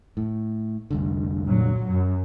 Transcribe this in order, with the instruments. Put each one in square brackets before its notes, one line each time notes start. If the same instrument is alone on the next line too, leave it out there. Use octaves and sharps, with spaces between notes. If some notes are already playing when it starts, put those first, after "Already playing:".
[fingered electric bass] A2
F1 C2 D3
[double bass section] A#2 F#3
F#2